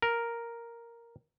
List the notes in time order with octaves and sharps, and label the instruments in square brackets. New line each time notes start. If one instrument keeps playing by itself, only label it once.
[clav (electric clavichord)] A#4